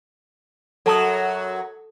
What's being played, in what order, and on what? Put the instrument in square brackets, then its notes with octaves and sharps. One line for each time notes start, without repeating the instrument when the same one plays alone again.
[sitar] F#2 F#3 [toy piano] A4 A5 D#6